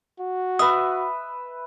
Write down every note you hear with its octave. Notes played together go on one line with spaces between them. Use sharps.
F#4
B4 E5 D#6